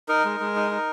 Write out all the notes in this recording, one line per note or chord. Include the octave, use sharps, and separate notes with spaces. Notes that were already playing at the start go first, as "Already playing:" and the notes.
D#4 A#4
G#3
G#3
D#4
D#4